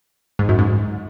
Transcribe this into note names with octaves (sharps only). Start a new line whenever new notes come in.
G#2
F#2
G#2